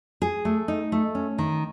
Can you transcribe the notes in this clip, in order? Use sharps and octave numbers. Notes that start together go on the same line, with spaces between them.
G#4
A3
D#4
A3
C#4
D#3